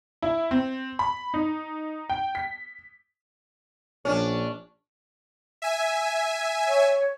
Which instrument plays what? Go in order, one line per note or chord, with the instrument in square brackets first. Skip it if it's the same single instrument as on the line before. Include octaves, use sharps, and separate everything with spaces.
[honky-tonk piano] E4
C4
B5
D#4
G5
B6
[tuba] A#1 [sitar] C#4 D4
[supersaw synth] E5 G#5
[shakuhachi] C#5